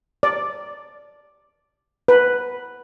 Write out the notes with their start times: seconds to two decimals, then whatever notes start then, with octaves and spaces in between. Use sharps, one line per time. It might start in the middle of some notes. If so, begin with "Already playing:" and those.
0.23 D5
2.08 B4